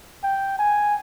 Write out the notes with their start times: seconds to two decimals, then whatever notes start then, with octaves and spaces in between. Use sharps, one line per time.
0.23 G5
0.59 G#5